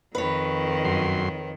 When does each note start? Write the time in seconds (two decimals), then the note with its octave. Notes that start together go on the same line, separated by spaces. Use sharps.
0.15 F2 D#3 B4 C#5
0.85 F#2 C6